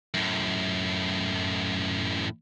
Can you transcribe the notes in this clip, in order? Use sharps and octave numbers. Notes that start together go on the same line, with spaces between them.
F#2 A2